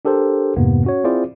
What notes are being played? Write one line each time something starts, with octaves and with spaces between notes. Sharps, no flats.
D4 G4 A4 A#4 C5
F2 G#2 C3 A#3 B3
C#4 F#4 C#5
C4 E4 F4 G#4 C5 D5